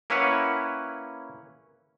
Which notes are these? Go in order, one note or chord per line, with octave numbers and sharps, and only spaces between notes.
A#3 C#4 E4 B4 C#5 F#5